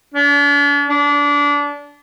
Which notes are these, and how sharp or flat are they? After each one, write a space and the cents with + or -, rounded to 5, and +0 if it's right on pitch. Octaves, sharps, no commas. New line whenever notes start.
D4 -45
D4 -25